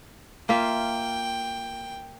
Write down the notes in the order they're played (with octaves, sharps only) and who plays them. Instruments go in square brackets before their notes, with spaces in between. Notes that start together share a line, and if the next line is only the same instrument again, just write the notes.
[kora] A#3 F4 E5 [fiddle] G5